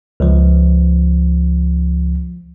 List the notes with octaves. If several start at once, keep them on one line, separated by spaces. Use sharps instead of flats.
C#2 F3